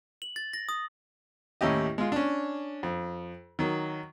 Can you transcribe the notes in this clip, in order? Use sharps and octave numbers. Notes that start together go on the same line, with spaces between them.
F#7
A6
A#6
D#6
D#2 A2 C#4 E4 G4 D#5
G#3 F4
C#4 D4
F2
D#3 F#3